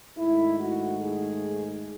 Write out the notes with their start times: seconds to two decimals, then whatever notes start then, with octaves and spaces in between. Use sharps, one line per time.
0.17 G#2 D#3 A3 E4
0.59 F#4
1.01 G#4